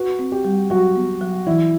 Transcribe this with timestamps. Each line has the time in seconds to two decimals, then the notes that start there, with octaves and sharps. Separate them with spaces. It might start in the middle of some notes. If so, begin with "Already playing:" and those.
Already playing: F#4 B4
0.19 C4
0.32 G4
0.45 G3
0.70 F#3 F#4
0.96 B3
1.21 F#3
1.47 E3 E4